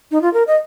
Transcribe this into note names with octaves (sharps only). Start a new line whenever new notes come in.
D#4
F4
A#4
D#5